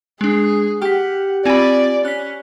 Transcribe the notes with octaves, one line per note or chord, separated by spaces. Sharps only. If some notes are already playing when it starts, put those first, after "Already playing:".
G#3 D4 G#4
G4 F#5 F6 B6
C4 F4 D5 G#5 B5
C#4 F#6 B6